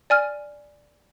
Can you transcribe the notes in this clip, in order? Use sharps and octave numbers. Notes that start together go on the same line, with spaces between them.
D5 G#5 F6